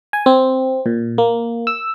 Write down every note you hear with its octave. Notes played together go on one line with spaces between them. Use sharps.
G#5
C4
A#2
A#3
E6